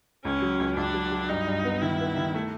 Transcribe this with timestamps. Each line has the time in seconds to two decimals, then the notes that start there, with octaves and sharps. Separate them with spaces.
0.25 C#2 C#4
0.42 F#3
0.60 C#2
0.77 C#2 D4
0.94 F#3
1.12 F#3
1.29 G2 D#4
1.47 G2
1.64 B3
1.81 D#3 E4
1.99 B3
2.16 D#3
2.35 A3